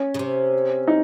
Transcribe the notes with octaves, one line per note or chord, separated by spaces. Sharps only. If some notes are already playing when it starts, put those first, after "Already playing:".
Already playing: C#4
C#3
C3
D#4